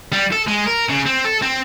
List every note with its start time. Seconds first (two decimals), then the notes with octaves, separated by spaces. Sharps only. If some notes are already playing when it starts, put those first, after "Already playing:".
0.13 G3
0.33 A4
0.48 G#3
0.68 A#4
0.90 C#3
1.06 C4
1.25 A4
1.42 C4